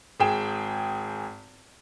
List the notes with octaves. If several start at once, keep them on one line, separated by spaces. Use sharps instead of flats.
G#1 G#4 G5 E7